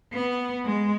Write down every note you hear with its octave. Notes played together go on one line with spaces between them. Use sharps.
B3
G#3